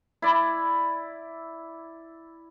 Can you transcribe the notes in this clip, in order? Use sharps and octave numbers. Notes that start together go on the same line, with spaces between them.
E4 D5